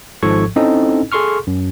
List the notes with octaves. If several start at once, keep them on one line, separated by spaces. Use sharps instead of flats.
G#1 G#2 F3 A4 C#6 G#6
C4 C#4 D#4 E4 A4 D#5
G#4 A4 C6 C#6 F6
F#2